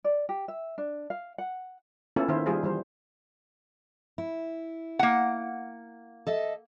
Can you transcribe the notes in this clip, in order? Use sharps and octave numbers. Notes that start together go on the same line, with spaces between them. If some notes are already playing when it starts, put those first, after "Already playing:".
D5
G4
E5
D4
F5
F#5
A#3 B3 C#4 E4 F4 A4
D#3 E4 C5
G3 F4 G#4 C5
E3 G3 C5
E4
A#3 F#5
A4 D#5 E5